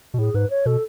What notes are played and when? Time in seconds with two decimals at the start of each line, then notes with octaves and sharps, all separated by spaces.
0.14 B2
0.18 A2 G#4
0.34 G#2 B4
0.50 C#5
0.66 B2 A4